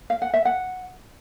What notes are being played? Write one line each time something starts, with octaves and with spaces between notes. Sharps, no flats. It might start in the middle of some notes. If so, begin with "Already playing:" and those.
F5
F#5
E5
F#5